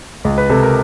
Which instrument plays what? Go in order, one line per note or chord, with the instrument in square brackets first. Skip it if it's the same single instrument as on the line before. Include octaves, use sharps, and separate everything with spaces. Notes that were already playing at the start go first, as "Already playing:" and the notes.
[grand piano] C#2
B4
C3 A4
A#4